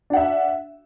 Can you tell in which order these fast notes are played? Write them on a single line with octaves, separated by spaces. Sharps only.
D4 F#5 E5